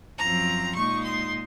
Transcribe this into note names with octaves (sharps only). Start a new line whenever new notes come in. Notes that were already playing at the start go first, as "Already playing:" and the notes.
F#2 F3 C4 A#5
A#2 G#3 D#4 C#6
C6